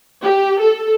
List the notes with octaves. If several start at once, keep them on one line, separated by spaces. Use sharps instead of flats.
G4
A4